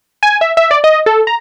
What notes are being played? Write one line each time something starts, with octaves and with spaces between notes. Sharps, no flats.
G#5
E5
E5
D5
D#5
A4
A#5